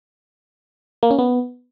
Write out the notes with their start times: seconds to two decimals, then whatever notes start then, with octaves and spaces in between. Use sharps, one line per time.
1.03 A#3
1.11 C#4
1.19 B3